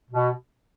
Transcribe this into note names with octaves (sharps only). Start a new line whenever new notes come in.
B2